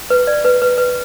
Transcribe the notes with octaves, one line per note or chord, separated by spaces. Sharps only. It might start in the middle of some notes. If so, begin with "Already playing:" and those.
B4
D5
B4
B4
B4